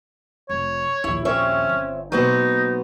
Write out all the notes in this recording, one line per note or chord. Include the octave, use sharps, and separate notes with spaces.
F1 C#5
A#1 D#2 E4
C4 C#4 C#5 E5
G1
B2 F#3 A#3 B3 D#4 C5